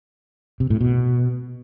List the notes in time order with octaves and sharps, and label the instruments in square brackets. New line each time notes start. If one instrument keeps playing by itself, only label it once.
[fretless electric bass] C3
A2
B2